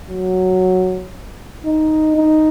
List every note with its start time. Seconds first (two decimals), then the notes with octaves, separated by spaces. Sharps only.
0.10 F#3
1.65 D#4
2.17 D#4